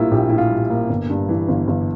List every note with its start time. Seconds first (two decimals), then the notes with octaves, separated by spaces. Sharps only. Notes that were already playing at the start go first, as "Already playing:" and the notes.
Already playing: A#1 A2 G3 A#3 E4 F4
0.11 A#1 G4
0.30 A2 E4
0.38 F4
0.50 G3
0.70 A#3
0.89 G1
1.10 G2
1.29 E3
1.48 G1
1.68 G1